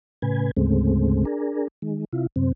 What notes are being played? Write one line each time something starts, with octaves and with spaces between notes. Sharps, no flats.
A2 C#3 B4 G#5
D2 G#2 C#3 G#3 A3 C4
D4 G#4 A#4
D#3 G#3
C3 E4 F4
F#2 C3 C4